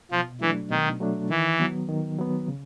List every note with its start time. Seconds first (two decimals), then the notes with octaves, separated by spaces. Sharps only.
0.11 B2 F3
0.41 E3 F#3 A3 D4
0.70 B2 D#3
1.00 F#3 A3 D4
1.30 D#3 E3
1.59 F#3 B3
1.89 D#3
2.18 F#3 B3
2.48 C#3